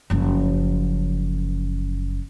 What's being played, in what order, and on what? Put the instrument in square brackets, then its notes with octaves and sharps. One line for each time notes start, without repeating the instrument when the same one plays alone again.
[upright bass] F#1 F3